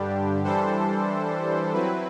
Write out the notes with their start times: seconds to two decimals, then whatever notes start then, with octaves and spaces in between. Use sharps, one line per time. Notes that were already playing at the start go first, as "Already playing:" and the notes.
Already playing: G2 D3 G3 D4 G4
0.44 E3 G3 D4 A4 C5
1.73 F#3 C4 E4 B4